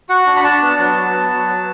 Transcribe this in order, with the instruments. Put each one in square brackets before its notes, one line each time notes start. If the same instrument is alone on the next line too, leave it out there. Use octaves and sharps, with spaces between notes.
[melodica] F#4 F#5
D4
B5
D4 A5
B3
F#3
F#3
B3
F#3
F#3